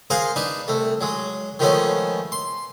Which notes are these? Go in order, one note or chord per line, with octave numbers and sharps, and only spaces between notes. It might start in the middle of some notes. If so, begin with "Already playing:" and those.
G#4 A#4 C5 F5 F#5
D4 D#4 B4
C2 A3
F#3 G#3
D#3 F3 G#3 A3 B3 C#4
C6